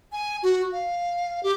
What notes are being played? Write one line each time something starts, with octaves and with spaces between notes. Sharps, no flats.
G#5
F#4
F5
G4